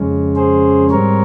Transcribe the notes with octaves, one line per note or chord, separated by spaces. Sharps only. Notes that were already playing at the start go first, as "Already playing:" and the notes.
Already playing: F2 C#3 G#3 C#4
G#4 C5
G#2 G3 C4 A#4 C#5